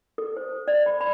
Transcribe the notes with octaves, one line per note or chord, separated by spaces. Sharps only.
A4
C5
D5
B5
B5